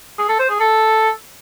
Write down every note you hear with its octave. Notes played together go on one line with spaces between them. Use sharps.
G#4
A4
C5
G#4
A4